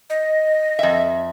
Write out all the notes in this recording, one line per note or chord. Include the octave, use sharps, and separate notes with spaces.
D#5
F2 E5